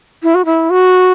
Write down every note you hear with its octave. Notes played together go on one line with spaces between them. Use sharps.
E4
F#4
E4
F#4